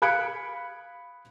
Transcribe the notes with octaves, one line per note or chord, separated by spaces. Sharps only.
F5 B5 F#6 G#6 C#7 D7